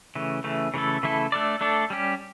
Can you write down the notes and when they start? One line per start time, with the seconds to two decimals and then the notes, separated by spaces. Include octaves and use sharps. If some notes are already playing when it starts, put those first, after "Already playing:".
0.15 C#3 E3 A3
0.44 C#3 E3 A3
0.74 C#3 E3 A3 E4 A4
1.03 C#3 E3 A3 E4 A4
1.32 A3 D4 A4 D5
1.61 A3 D4 A4 D5
1.90 G3 C#4 G4